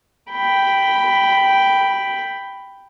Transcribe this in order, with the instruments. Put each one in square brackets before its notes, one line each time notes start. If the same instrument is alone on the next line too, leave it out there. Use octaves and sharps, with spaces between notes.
[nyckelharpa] G5 B5